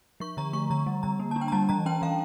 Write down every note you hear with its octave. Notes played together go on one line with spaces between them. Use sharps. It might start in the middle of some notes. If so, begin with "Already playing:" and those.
F3 C#6
D3 A#5
A3 C#6
D3 A#5
G3
D3 A#5
A#3
A5
D4
G5
A#5
G3 A5
E3 A#5
C#4 G5
E3 F5